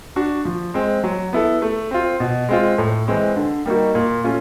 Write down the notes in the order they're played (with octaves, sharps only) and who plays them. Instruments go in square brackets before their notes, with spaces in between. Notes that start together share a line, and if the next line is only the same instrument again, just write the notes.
[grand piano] D4 F#4
F3
G#3 C4
F#3
B3 E4 A4
A3
C4 F4
B2
G#3 C4 F4
A2
E3 G#3 C4
D3
G3 A#3 D#4 F#4
A#2
A3 C#4 F4